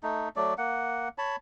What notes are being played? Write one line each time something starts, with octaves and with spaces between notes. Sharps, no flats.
A3 D#4
F#3 A3 D5
A#3 F#5
C#5 A5 B5